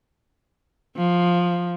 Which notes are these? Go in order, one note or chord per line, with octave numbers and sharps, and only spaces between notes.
F3